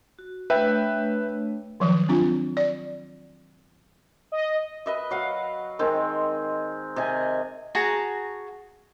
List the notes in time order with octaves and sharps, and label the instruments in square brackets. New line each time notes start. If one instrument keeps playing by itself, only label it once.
[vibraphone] F#4
[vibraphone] A3 D4 C#5 [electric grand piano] B4 E5 G5
[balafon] D#3 F3 F#3
C4 D4 F4
D5
[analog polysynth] D#5
[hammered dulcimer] B4 D#5 E5
F#3 F5 F#5
D#3 G#3 C4 A#4
C3 D#5 G#5
[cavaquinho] F#4 G#4 A5 A#5